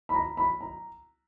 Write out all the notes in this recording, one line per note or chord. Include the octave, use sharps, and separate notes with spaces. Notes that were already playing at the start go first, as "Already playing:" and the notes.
B5
A#5
B5
A#5